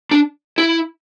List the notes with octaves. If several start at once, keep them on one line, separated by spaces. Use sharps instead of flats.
D4
E4